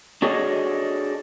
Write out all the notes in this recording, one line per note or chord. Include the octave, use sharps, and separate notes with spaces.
D4 F#4 G#4 A4 C#5 D#5